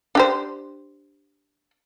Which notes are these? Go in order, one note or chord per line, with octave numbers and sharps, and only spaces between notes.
D4 G4 C5